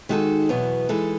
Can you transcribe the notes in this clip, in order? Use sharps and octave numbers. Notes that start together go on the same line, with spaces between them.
D#3 G#3 D#4 F#4 A4
E2 B2 F#3 B3 E4
E3 G#3 D#4 A4